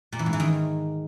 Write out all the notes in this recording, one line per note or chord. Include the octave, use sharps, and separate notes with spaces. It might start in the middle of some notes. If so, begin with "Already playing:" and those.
A#2
E3
G#2
E3
D#3